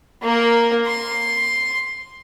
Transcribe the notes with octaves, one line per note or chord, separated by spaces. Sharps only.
A#3 A#4
C6